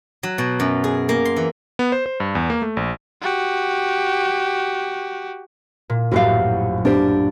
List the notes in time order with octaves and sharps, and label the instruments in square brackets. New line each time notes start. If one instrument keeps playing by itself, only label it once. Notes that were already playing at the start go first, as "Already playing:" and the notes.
[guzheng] F#3
B2
F#2
G#4
A#3
C6
E3
[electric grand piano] B3
C5
C5
G2
E2
A#3
A3
A#1
[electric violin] F#4 G4
[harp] A#2
[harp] A#1 F#2 A2 [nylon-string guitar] F#4 G4 F5
[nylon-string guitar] D4 G4 C5